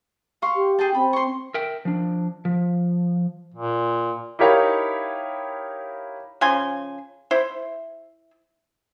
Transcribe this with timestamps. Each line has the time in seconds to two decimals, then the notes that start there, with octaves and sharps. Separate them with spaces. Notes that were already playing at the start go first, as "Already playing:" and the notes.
0.42 F5 C6 C#6
0.55 G4
0.79 G#4 G5 A5
0.95 C4 B5
1.13 C6 C#6
1.54 A#4 E5 G5
1.85 F3 D4
2.45 F3
3.54 A#2
4.39 D#4 E4 G4 A#4 C#5 F5
6.41 C#3 F3 G#5 C6
7.31 E4 C5